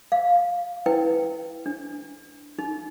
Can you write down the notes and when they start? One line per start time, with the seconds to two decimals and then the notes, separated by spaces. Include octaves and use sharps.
0.12 F5
0.86 E4 B4 G5
1.66 D4
2.59 D#4